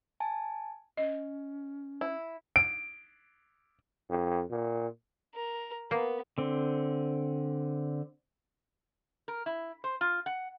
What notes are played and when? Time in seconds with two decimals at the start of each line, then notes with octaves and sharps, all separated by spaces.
0.20 G#5 A5
0.97 C#4 D#5
2.01 E4
2.56 D7
4.10 F2
4.51 A#2
5.35 A#4
5.91 A#3 B3
6.38 D3 C4
9.28 A#4
9.46 E4
9.84 C5
10.01 F4
10.26 F#5